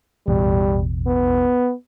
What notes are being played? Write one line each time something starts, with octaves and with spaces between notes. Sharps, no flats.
A1 E2 B2 G3
B3